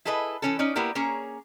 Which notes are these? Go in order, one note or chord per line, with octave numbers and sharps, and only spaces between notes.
E4 G#4 A4 B4 D#5
E3 C#4 A4
C#4 D#4 D5
A#3 B3 E4 G4 A#4
A#3 C#4 G#4 C#5 A#5